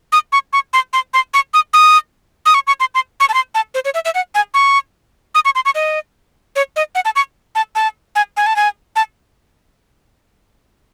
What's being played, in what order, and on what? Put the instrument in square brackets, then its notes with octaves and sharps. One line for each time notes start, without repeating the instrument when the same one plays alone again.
[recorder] D#6
C#6
C#6
C6
C6
C6
C#6
D#6
D#6
D#6
C#6
C#6
C6
C6
C#6
A5
C6
A5
C5
C#5
E5
E5
F#5
G#5
C#6
D#6
C#6
C6
C#6
D#5
C#5
D#5
F#5
A5
C#6
A5
A5
G#5
G#5
A5
G#5
A5